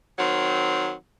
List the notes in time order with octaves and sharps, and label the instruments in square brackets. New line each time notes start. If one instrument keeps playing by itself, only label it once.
[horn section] D#3 F#3 C4